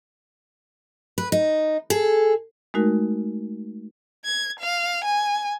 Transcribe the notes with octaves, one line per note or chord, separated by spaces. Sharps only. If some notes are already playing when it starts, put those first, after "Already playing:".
B4
D#4
G#4 A4
G#3 A3 D#4 F#4 A#4
G#6
F5
G#5